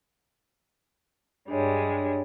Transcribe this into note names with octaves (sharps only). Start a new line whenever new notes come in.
G2 G3 G#3 D4 C#5